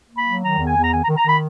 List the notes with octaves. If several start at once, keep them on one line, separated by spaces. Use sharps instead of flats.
A#3
B5
F#3
D#3 A#5
E2
G#5
E2
A#5
D#3 G#5
A#5
D#3
A#5
D#3 B5